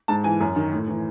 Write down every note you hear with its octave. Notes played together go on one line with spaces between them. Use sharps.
G#2 A5
E3 G#5
F#2
D#3
A2
E3